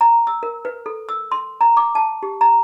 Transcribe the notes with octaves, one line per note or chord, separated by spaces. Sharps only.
A#5
E6
A#4
B4
A4
E6
C6
A#5
D6
A5
G4
A#5